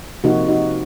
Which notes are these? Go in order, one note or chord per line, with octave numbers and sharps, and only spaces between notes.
C3 F3 A#3 D#4 F#4
D#4 F#4